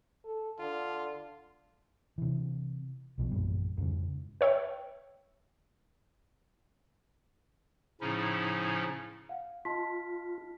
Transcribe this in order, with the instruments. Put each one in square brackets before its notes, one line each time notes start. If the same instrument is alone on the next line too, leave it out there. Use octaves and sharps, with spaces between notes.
[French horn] A4
[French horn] D3 [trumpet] F4
[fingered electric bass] C3 E3
B1 B2 F3
A1 F#2 A#2 G3
F2 G#2 C#3
[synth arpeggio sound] B4 C#5 E5 G5
[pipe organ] A2 C#3 F3 C#4 D#4 E4
[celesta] F5 F#5
[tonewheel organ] F4 [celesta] D#5 A5 B6